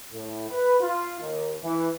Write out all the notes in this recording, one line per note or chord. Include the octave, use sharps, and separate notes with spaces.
A2
B4
F4
D#2
E3